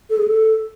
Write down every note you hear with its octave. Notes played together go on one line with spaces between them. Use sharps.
A4
G#4
A4